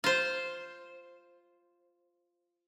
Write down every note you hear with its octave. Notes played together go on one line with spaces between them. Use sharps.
F4 C5